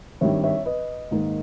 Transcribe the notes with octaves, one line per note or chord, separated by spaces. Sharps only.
G#1 G2 D#3 G3 C#5 E5
C#5 E5
B4 D#5
G#2 D#3 A#3 D#4